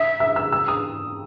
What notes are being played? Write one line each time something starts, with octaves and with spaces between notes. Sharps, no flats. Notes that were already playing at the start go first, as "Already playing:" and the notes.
Already playing: E5 D#6
E6
E6
E6
D#6